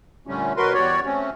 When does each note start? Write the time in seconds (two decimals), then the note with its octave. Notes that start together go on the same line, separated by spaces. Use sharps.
0.27 A#2 D3 G3 A3 C#4
0.57 B2 F#3 F#4 A#4 B4 C6
0.73 E2 G3 F#4 C#5 D5
1.05 A3 C4 C#4